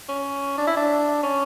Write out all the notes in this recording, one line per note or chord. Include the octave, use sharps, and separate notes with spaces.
C#4
D4
E4
D4
C#4